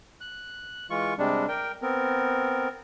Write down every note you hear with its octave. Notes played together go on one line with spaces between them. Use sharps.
F#6
E3 G#3 F4 C#6
C3 G3 G#3 D4
A#4 G5
B3 C4 A#4